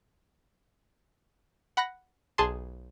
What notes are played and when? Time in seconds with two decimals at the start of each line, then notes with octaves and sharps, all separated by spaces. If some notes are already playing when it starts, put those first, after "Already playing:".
1.77 F#5 B5 F#6 A#6
2.38 B1 G#4 A5 C6